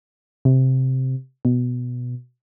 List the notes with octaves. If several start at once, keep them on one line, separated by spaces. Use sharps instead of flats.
C3
B2